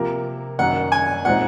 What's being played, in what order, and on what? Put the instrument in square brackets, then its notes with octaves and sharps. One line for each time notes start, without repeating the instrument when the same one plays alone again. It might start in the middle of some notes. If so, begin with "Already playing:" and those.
Already playing: [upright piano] C3 F3 A#3 F4 A#4
[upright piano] F#1 F#2 D#3 A#3 [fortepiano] F#5
[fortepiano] G#5
[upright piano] A#2 G#3 C4 D#4 [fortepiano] F#5